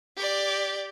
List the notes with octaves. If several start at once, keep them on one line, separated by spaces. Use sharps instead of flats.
G4 D5